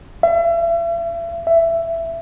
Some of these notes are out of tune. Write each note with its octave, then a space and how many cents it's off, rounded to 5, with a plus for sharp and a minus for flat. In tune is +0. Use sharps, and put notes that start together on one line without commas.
E5 +40
E5 +15